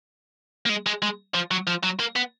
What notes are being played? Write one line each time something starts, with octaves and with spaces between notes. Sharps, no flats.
A#3
G#3
G#3
G#3
F3
F#3
F3
F#3
A#3
B3